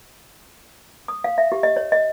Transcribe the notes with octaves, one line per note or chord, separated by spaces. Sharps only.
D#6
F5
E5
G4
D#5
C#5
D#5